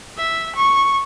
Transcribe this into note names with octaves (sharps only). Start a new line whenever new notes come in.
E5
C#6